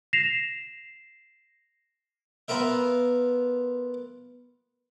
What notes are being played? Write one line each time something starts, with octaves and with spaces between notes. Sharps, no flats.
A#6 C7 E7 F7
B3 F4 A#4 E5